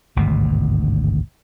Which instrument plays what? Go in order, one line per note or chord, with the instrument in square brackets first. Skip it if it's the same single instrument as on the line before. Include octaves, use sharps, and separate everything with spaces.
[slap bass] G#1 D2 G2 B2